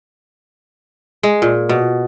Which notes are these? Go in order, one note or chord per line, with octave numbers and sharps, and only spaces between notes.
G#3
A#2
B2